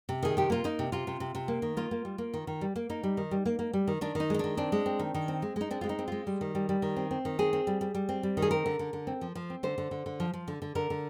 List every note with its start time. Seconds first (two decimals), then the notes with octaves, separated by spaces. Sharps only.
0.09 C3
0.23 D#3 G#4
0.37 C3 G4
0.50 A#3 F4
0.64 A#3 D#4
0.79 C3
0.92 C3 F4
1.07 C3
1.20 C3
1.35 C3
1.48 A#3
1.62 D#3
1.77 A#3 F4
1.91 A#3
2.05 G3
2.18 A#3
2.34 D#3
2.47 D#3
2.61 G3
2.76 A#3
2.89 A#3 D#4
3.03 G3
3.17 D#3
3.31 G3
3.45 A#3
3.59 A#3
3.73 G3
3.87 D#3
4.01 D#3 D4
4.15 D#3 D#4
4.30 G#3 D#4
4.39 D#3 D4
4.57 C4 D4
4.72 G#3
4.86 C4
4.99 D#3
5.14 D#3
5.28 C4
5.42 G#3
5.56 G#3 D#4
5.71 C4 D4
5.81 G#3 F4
5.89 D#4
5.99 C4
6.08 G#3 F4
6.27 G3
6.41 D#3
6.55 G3
6.69 G3
6.82 D#3
6.96 C4
7.11 C4
7.25 D#3
7.39 C4 G#4
7.53 C4
7.67 G3
7.81 G3
7.95 G3
8.09 C4
8.23 G3
8.37 D#3
8.42 G#4
8.51 C4 A#4
8.66 D3
8.79 D3
8.93 D3
9.07 C4
9.21 F3
9.35 F3
9.50 C4
9.63 D3 C5
9.78 D3
9.91 D3
10.06 D3
10.20 F3
10.34 F3
10.48 D3
10.62 D3
10.75 D3 A#4
10.90 D3